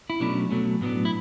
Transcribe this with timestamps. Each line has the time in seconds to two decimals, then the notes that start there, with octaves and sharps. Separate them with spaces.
0.10 E4
0.20 B2 F#3 A3 C#4 D4
0.51 B2 F#3 A3 C#4
0.81 A2 F#3 B3 D4
1.05 E4